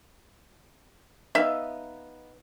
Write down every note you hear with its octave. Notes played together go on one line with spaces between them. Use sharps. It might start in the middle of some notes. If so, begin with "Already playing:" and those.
B3 D#4 E5 F5